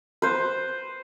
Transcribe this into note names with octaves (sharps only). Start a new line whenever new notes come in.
B4 C5